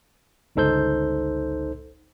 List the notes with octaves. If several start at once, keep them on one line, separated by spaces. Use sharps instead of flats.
G1 C#2 D#4 A4 C5 G6